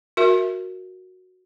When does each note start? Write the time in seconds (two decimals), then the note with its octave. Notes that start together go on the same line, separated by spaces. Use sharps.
0.17 F#4 A#4 E5